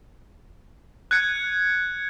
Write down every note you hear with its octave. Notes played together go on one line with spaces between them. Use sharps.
F#6 G#6 C#7